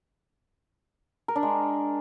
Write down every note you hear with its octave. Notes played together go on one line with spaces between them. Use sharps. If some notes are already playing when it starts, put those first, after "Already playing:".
A#4
D4
G#3